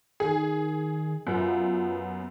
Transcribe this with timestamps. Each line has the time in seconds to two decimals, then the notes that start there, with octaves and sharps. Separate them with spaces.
0.20 D#3 G#4
1.27 F#2 B3 F4